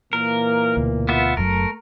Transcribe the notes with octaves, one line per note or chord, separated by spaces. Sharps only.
A#2 E3 A#3 A#4
D2 B2
B3 F4 E5
F#1 F#2 F#3 A3 A#4